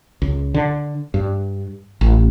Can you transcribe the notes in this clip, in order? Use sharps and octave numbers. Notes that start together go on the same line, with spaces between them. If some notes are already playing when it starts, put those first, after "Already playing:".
C#2
D3
G2
A1